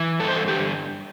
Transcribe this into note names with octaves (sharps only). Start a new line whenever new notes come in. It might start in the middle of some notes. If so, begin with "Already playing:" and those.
Already playing: E3
G2 A4
C5
A4
D3 G4